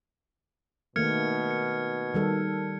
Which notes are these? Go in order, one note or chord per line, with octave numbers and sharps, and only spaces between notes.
B2 D#3 A3 A#3 F6 G#6 C#7
C#7
D#3 G3 A4